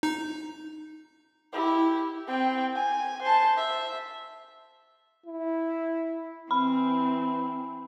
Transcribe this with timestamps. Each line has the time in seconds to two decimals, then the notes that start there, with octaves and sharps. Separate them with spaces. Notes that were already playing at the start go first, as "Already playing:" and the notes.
0.03 D#4
1.53 E4 G4
2.28 C4 G5
2.76 G#5
3.23 C5 A5
3.58 E5
5.26 E4
6.51 E3 C4 B5